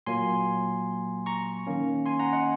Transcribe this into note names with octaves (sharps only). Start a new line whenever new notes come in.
A#2 F#3 A#3 G#5 C6
A#5 C#6
D#3 A#3 C#4
G#5 C6
F#5 A#5
D#5 F#5